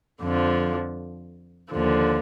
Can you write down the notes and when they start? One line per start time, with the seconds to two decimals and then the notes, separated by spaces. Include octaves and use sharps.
0.21 F2 D3 F3
1.71 D#2 D3 F3